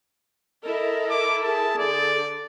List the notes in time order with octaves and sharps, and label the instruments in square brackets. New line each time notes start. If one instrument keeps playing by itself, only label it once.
[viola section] E4 A4 A#4 [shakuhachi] D#5
[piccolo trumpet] D6
[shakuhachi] G#4 [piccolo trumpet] A5
[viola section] D3 [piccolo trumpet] D5